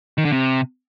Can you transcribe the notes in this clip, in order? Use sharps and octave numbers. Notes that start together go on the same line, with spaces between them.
D#3
D3
C3